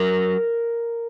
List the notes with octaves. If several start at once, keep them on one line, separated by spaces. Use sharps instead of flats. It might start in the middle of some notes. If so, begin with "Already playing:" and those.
Already playing: F#3 A#4